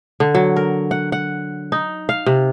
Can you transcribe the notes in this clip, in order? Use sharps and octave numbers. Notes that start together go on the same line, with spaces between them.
D3
F#3
A#4
F#5
F#5
D#4
F5
C3